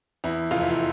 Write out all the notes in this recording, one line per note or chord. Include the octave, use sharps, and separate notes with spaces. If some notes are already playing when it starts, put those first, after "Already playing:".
E2 E4
F1 F4
E4
F4